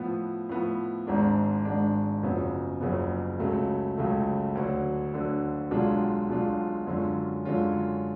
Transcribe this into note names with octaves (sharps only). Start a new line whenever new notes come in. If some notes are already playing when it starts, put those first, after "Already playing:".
Already playing: A2 F3 B3
A2 F3 B3
G#1 G#2 G#3 D4
G#1 G#2 G#3 D4
F#1 F#2 C#3 F3 B3
F#1 F#2 C#3 F3 B3
C#2 C#3 F#3 A3
C#2 C#3 F#3 A3
D2 D3 F#3
D2 D3 F#3
B1 B2 G#3 D4 F4
B1 B2 G#3 D4 F4
F#2 D3 G#3 C#4 F4
F#2 D3 G#3 C#4 F4